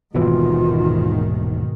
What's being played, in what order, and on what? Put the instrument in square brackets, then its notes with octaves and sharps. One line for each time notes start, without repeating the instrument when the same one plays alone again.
[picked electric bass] D#1 D#2 E3 [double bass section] G#2 D#3 [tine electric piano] B2 [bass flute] F4